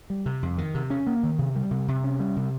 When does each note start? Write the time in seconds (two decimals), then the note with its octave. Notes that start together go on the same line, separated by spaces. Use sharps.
0.10 G3
0.26 C3
0.43 F2
0.58 D#3
0.75 C3
0.90 C#4
1.07 A#3
1.23 D#3
1.38 C3
1.56 G3
1.71 C3
1.88 C3
2.04 C#4
2.20 G3
2.36 C3